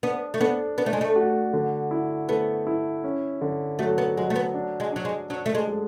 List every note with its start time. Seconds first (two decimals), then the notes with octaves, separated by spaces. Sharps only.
0.03 B3 D4
0.34 A3
0.40 B3 D4
0.78 B3 D4
0.86 A3
0.93 G#3
1.01 A3
1.16 F#4
1.53 D3
1.91 E4
2.29 A3 B3
2.67 E4
3.04 C#4
3.41 D3
3.79 F#3 A3
3.98 B3
4.17 F#3 G#3
4.30 A3
4.36 B3
4.54 D4
4.80 G#3
4.92 F#3 D4
5.05 G#3
5.30 F#3 D4
5.46 A3
5.55 G#3
5.67 G#3